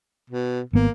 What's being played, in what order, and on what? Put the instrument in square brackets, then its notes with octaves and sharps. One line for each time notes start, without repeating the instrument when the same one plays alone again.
[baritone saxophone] B2
[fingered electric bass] G#1 B3 [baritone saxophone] A#3